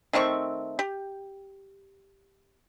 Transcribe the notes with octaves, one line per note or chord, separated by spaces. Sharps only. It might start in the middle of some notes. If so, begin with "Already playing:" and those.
D#3 A3 C4 C#6
G4